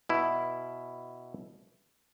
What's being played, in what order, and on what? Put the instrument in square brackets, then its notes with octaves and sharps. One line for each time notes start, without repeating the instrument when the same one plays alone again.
[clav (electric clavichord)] B2 E4